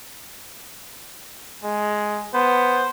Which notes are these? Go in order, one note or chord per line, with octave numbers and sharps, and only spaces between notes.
G#3
B3 C5